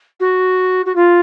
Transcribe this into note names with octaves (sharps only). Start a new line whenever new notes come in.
F#4
F#4
F4